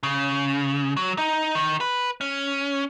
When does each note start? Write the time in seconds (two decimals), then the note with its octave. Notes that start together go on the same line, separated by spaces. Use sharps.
0.03 C#3
0.97 F#3
1.18 D#4
1.55 D#3
1.81 B4
2.21 C#4